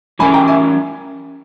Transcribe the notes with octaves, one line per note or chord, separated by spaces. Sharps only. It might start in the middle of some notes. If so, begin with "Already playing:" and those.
E3 G3 C#4 E4 A#4 G#5 B5
G5 A#5
E5 G#5